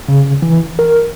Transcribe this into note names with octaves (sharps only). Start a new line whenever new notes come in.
C#3
E3
A#4